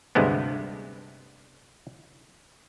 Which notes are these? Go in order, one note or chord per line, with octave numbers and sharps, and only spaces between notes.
D2 G2 C3 G#3 A3 B3